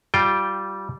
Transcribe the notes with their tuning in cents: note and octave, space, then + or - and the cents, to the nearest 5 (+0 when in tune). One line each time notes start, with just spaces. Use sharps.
G3 -15 F4 +0 G5 +0